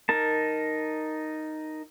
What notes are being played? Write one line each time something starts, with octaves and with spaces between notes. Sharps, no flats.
D#4 A#4 A5